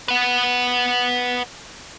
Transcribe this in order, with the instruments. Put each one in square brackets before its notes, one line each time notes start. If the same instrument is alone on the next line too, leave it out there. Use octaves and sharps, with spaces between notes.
[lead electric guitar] B4 F#5